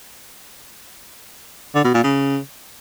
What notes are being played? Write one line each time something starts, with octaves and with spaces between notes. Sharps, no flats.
D3
B2
A#2
C#3